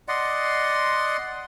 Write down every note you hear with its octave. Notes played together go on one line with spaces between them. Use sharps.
D5 D#5 F#5 C6